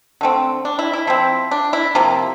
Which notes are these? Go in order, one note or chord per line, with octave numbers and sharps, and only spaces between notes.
D3 A3 C4
D4
E4
E4
F3 C4
D4
E4
C3 F3 A#3